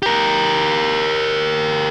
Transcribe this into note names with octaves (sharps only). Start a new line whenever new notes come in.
G4 A#4